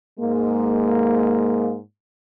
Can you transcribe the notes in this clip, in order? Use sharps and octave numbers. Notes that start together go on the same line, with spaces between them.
G#2 G#3 A#3